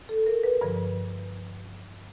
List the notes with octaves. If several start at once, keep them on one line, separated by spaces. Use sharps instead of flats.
A4
A#4
B4
G2 D3 F3